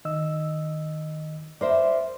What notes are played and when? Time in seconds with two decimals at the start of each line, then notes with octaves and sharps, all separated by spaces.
0.05 D#3 D#5 E6
1.61 A#4 C5 D5 E5